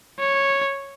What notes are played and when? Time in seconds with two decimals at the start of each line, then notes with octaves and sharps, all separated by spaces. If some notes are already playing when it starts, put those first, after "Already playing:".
0.20 C#5